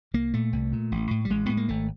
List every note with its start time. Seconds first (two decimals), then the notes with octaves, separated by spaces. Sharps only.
0.14 C2 A#3
0.34 A#2 A3
0.53 C2
0.73 A#2
0.92 A1
1.11 A2
1.25 G3
1.30 A1 G#3
1.46 A2 B3
1.57 A#3
1.69 G#1 A3